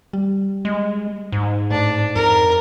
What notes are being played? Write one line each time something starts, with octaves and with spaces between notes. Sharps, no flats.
G3
G#3
G#2
A2 D4
F2 A#4